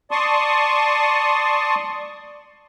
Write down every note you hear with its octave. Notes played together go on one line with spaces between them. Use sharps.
D5 A5 C6 C#6 D#6